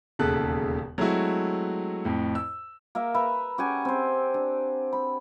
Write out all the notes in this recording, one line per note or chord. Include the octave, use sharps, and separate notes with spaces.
E1 D#2 C#3 A4 A5 F#6
F#3 G#3 A3 C4 E4 F#4
F2 A2
E6
A#3 A#4 E5
B4 E5 A#5 B5
C#4 G4 F#5 G#5
C4 C5
D4
B5